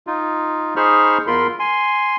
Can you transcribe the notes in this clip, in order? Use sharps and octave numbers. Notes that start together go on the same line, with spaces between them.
D#4 F4
D#4 G#4 C5 B5 C#6 F6
E2 F4 A#4 B5 C6
G#5 C6